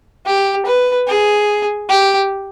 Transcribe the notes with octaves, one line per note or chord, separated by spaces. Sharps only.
G4
B4
G#4
G4